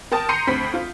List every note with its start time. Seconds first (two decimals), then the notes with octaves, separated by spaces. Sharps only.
0.12 A#4 G5 A5 D#6
0.29 A#5 C6 G6 C7 C#7 D#7
0.47 D2 C4 B5 B6
0.74 F4